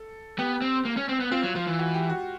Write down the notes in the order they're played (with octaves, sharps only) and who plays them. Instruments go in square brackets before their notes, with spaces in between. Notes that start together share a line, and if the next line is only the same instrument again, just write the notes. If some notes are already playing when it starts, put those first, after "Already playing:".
Already playing: [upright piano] A4
[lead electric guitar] B3 [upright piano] G4
[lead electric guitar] C4
A#3
C#4
C4
B3
[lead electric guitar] C4 [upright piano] F4
[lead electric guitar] F#3
[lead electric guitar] F3 [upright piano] F4
[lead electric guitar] E3
[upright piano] F#4
G4
F#4